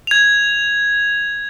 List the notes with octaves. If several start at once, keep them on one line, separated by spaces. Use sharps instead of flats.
G#6 F7